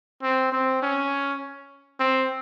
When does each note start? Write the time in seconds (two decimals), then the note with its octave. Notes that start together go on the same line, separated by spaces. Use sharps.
0.22 C4
0.52 C4
0.82 C#4
2.00 C4